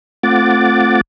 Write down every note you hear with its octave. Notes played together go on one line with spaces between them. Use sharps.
A3 C4 F4 F#5 D6 A6